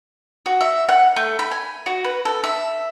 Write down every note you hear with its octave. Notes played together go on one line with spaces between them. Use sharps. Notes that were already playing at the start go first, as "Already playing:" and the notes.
F#4
E5
F#5
A3
B5
G#5
F#4
B4
A4
E5